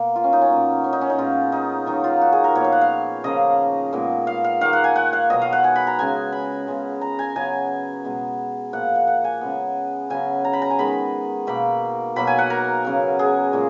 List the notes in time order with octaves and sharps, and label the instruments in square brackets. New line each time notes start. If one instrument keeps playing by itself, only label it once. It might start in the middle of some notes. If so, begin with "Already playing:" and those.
Already playing: [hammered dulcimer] B2 A#3
F4
C#4
D#4
C#4
A#2 F#3 B3
C#4
D#4
C#4
D#4
A#2 G#3 B3 F4
D#4
D#3 F#3 A#3 D#4
F4
F#4
G#4
A#4
A#2 F3 B3 C#5
F5
F#5
F5
C#3 F3 A#3 D#5
A#2 G#3 B3
F5
F5
D#3 A#3 F5
F#5
G#5
F#5
F5
B2 F#3 B3 D#5
F5
F#5
G#5
B5
A#5
C#3 G#3 B3 G#5
B5
C#3 G#3 B3
A#5
G#5
C#3 F#3 B3 G#5
B2 G#3 B3
A#2 F3 A#3 F#5
F#5
F#5
G#5
C#3 G#3 B3
C#3 F#3 B3 G#5
A#5
B5
A#5
G#5
D#3 G#3 B3 B5
B2 A#3 B5
B2 F#3 A#3 B5
G#5
F#5
A#4
C#3 F#3 B3
G#4
A#2 G#3